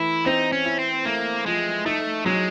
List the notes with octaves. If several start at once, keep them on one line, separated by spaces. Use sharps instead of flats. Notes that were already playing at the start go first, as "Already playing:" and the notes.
Already playing: E3 A3 E4
C4 D#4
C#4
E4
C4
A3 A#3
F3 G#3
A3 D#4
F#3 G#3